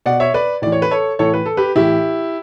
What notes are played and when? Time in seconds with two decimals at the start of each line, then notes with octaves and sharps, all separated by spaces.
0.06 B2 D5 F#5
0.20 C#5 E5
0.34 B4 D5
0.62 A2 E3 D5
0.72 C#5
0.82 B4
0.91 A4 C#5
1.19 A2 E3 A4 C#5
1.34 B4
1.46 A4
1.57 G4 B4
1.76 A2 E3 E4 G4